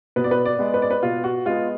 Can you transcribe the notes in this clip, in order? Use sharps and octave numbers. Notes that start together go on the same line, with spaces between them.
B2 B4
D5
B4
D5
G#3 B3
B4
D5
B4
B2 F4
F#4
G#3 B3 F4